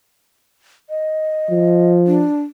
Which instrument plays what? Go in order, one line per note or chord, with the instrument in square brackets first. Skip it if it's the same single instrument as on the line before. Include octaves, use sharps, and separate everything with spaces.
[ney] D#5
[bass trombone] F3
[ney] D4